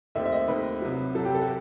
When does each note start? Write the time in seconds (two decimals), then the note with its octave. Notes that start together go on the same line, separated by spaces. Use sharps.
0.15 D#2 D#3 A3 C4 E5
0.25 E5
0.32 D#5
0.48 D#2 D#3 A3 C4 B4
0.82 C2 C3 F#3
1.15 C2 C3 F#3 A4
1.25 G4
1.34 A4
1.42 F#4